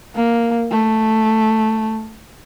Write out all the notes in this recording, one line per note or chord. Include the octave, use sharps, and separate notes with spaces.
A#3
A3